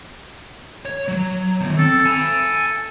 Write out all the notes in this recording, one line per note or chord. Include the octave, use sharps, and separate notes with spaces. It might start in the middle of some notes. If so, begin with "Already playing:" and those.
C#5
F#3
D#3 B3
C4 A4
A4 G#5 B5